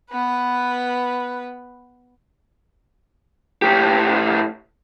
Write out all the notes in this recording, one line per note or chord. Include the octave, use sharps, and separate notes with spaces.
B3 B4
A2 G4